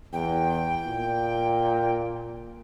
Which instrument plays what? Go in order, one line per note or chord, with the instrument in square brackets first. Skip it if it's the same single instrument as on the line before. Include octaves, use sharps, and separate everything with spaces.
[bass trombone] E2 [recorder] G5
[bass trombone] A#2